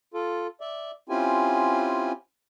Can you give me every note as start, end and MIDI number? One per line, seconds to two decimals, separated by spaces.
0.14 0.47 65
0.14 0.47 69
0.61 0.91 74
0.61 0.91 76
1.09 2.12 60
1.09 2.12 61
1.09 2.12 64
1.09 2.12 65
1.09 2.12 67
1.09 2.12 80